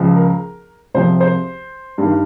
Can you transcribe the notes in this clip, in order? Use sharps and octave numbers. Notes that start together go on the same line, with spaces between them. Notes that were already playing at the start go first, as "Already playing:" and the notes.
Already playing: C#2 C#3 F3
A#4
C2 C3 F3 C5
C5
G2 D#3